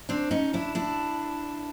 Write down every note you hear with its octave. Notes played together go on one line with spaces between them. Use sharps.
C4 D4
C#4 D#4
D4 E4
D4 E4